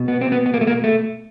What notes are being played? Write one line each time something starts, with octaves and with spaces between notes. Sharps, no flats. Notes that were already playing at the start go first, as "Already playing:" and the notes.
Already playing: B2
B3
C4
B3
B3
A#3
A3
A#3
A3